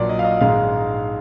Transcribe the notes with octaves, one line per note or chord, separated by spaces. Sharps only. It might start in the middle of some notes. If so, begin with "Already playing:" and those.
Already playing: A#1 A#2 F#3 D5
D#5
F5
D#5
A#1 G#2 D#3 G#3 F5